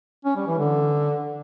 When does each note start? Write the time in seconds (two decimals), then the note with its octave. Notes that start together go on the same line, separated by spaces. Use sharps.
0.25 C#4
0.36 G3
0.47 E3
0.58 D3